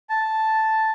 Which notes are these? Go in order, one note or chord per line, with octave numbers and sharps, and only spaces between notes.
A5